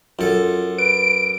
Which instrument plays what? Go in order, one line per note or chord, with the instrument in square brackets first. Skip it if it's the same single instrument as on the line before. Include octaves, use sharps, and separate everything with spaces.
[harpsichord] F#2 A4 [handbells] F4
[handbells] B4 [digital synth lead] D7